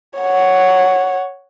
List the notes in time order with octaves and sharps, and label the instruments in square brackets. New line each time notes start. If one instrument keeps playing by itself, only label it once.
[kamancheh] C#5 F#5